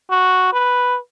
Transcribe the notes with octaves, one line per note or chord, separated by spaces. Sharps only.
F#4
B4